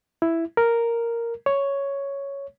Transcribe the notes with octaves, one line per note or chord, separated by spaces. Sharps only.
E4
A#4
C#5